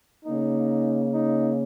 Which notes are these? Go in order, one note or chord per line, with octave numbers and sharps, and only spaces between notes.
C#3 A#3 D#4
D#4